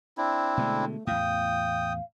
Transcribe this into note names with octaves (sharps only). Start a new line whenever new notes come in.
C4 D4 E4
B2 D3 G#3 A3
E2 A2 F5 G5 D#6